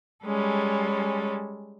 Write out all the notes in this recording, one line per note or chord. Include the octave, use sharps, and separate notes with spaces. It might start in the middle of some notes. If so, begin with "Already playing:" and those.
G3 G#3 C#4 A4